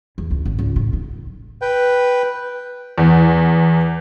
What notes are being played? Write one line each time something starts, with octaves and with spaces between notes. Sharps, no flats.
E2
C#2
G#1
C#2
A2
D#4
B4 G5
E2